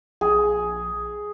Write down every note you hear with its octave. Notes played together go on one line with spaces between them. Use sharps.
A#1 G#4